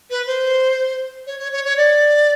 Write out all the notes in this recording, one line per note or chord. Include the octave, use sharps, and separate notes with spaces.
B4
C5
C#5
C#5
C#5
C#5
D5